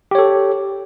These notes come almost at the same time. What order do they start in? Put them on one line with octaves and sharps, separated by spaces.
G4 C#5 A4